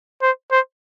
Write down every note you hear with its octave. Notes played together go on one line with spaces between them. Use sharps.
C5
C5